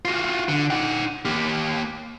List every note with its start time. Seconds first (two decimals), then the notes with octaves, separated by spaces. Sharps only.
0.05 F4 F#4
0.49 D3
0.70 D#4 F#5
1.25 A#3 G4